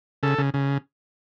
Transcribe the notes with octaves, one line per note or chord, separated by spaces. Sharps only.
C#3 A4
C#3
C#3